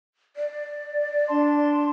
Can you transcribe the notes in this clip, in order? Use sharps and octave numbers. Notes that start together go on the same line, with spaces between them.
D5
D4 A5 C6